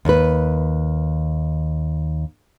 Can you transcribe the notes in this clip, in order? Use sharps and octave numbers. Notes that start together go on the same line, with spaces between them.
D#2 B4